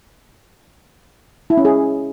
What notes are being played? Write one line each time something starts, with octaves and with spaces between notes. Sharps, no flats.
E4
C#4
G#4